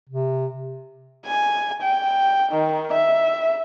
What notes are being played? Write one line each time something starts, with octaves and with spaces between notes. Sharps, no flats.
C3
G#5
G5
D#3
E5